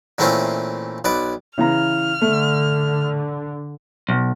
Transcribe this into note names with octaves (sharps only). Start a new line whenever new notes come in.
A#2 E3 A3 C4 C#4 F4
B1 B4 D5
C#3 E3 A#5 F6
D3 A3
B1